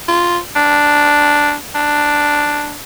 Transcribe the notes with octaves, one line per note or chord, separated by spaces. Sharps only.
F4
D4
D4